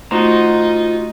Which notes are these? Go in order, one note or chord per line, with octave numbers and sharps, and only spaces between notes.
A3 D#4 F4 F#4 C5 A#5